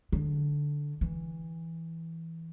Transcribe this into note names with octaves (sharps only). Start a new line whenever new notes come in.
D3
E3